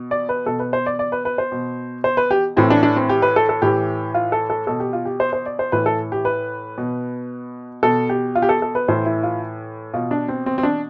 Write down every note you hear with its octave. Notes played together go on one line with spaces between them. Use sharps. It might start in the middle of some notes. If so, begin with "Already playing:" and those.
Already playing: B2
D5
B4
B2 A4
B4
C5
D5
D5
B4
B4
C5
B2
C5
B4
G4
A2 E3 C4
D4
D4
C4
G4
B4
A4
A4
A2 E3 G4
F4
A4
A4
B2 A4
G4
F4
G4
C5
C5
D5
C5
A2 E3 B4
A4
G4
B4
B2
B2 A4
G4
F4
G4
A4
A4
B4
A2 E3 C5
E4
F4
B2 F4
D4
C4
C4
C4
D4